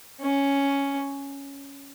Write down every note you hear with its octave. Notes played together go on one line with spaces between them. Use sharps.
C#4